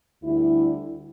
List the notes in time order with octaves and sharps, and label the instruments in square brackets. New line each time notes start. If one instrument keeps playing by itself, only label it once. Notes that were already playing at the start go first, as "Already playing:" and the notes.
[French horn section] D2 D3 G3 E4